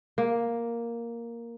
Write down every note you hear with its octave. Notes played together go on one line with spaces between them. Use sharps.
A#3